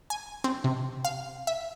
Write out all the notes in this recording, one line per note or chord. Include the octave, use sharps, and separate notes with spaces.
G#5
C4
C3
F5
E5